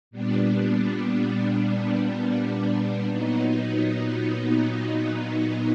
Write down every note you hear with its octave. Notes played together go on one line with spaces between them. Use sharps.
A#2 G3 B3 D4
A#2 F#3 B3 D#4